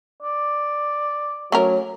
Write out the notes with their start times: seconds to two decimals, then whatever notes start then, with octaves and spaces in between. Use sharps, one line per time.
0.22 D5
1.52 F#3 A3 C#4 A#4